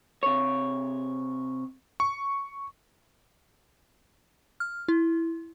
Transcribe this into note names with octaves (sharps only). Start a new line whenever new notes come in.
C3 C#5
C#6
F6
E4